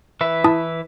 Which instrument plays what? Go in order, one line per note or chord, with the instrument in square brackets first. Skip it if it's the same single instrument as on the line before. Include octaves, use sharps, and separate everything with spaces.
[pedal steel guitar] E3 B4 E5
[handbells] E4 A5 D#6